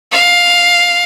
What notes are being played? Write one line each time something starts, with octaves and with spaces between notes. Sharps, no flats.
F5